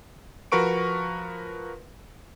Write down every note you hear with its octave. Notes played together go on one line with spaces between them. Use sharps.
F3 F#4 A#4 B4 C#6 D7